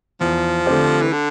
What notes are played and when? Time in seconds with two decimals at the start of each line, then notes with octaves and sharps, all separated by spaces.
0.20 E2 F3
0.66 D3 A3 C4 G4
1.02 E3
1.13 D3